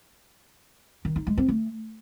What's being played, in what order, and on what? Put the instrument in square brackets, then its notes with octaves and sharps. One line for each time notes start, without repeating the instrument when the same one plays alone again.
[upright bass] D#3
D#4
G#3
C4
A3